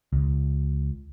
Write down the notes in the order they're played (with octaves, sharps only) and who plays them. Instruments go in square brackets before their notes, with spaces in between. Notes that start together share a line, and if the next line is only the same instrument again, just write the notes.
[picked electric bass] C#2